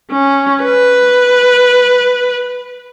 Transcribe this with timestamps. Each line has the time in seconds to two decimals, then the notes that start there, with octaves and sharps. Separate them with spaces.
0.11 C#4
0.63 B4